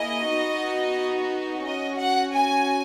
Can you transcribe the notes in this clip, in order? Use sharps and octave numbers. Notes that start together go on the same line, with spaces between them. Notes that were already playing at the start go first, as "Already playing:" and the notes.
Already playing: A#3 E4 G#4 D#5
B3 D#4 F#4
C#4 F#4 D#5
F#5
G#5